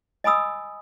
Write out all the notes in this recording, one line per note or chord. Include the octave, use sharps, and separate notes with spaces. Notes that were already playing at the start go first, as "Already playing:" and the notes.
D#5 G#5 B5 D#6 E6